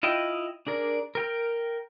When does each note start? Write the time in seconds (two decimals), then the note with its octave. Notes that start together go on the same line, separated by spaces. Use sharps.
0.03 E4 F4 D#5 G5
0.67 D4 G#4 A#4 D5
1.15 A#4 G5 F6